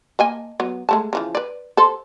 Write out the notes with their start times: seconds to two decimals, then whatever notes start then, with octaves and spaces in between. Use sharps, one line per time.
0.19 A#3 D#5 G#5
0.60 F#3 B3
0.89 G#3 A3 A5
1.13 C#3 E3 F3
1.35 B4 D5
1.77 A4 C5